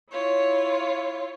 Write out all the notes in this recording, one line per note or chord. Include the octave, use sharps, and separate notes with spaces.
E4 F4 C#5